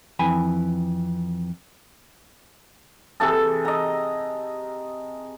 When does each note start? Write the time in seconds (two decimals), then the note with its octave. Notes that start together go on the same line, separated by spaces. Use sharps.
0.19 F2 E3 G#5 B5
3.20 C3 E3 G#4 A4
3.65 D#5 A#5